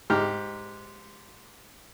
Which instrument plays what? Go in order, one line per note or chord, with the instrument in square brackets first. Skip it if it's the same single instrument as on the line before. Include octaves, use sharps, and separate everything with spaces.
[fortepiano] G#2 G4 A#5 F6